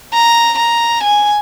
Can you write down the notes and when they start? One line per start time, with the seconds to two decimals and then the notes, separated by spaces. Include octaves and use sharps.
0.14 A#5
0.58 A#5
1.04 G#5